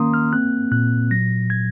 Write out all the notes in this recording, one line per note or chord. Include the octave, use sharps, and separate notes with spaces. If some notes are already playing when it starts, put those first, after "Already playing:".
Already playing: D#3 A#3 C#4 A#5 C6 D#6
F6
C4 F#6
A#2 F#6
F#3 A#6
G#6